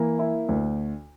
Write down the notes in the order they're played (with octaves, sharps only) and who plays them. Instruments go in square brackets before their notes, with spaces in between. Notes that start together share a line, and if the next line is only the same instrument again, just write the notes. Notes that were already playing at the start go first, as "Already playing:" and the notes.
Already playing: [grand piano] E3 A#3
E4
D2